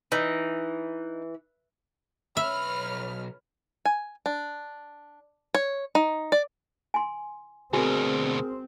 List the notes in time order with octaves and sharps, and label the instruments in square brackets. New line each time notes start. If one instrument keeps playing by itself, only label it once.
[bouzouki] E3 [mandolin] D#4
[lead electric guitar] B1 B5 [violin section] B4 C#5 F6 [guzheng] E5
[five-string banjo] G#5
D4
C#5
D#4
D5
[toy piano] G#5 C6
[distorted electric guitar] D2 B2 [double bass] C4 [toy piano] F#4 G#5 C#6 [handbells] G#4 A#4